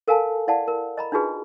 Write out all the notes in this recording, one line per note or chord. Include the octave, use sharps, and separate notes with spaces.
A4 A#4 F5 G#5 A5
E4 D5 F5 F#5 A5
A#4
D#5 A#5 B5
D4 D#4 F4 F#4 G#4 B4